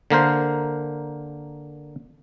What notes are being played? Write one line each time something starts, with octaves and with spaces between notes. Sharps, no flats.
D3 A#3 A#4 C5